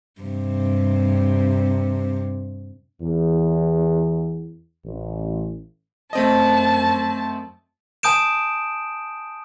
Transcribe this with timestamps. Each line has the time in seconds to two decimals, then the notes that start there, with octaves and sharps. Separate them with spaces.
0.21 G2 C3
3.02 E2
4.85 A1
6.13 F#2 A3 C4 D#5 A5
8.03 G#5 A5 D#6 G6 D7 E7